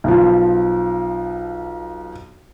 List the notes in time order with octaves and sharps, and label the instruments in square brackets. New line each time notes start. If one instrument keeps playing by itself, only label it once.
[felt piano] B1 F3